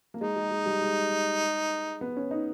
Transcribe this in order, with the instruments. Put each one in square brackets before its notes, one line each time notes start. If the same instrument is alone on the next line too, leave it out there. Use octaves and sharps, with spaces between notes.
[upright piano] A#3
[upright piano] G#3 [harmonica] D#4
[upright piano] G#3
G#3
G3
G#3
B3
C#4
D#4